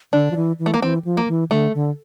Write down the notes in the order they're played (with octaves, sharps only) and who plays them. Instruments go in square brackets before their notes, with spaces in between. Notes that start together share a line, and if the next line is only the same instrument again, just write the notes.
[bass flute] D3 [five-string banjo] D4
[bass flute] F3
E3
E3
[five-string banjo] A3
A#3
[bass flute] E3 [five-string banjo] C4
[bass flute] F3
[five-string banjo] A#3
[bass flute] E3
[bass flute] D3 [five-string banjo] A3
[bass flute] D3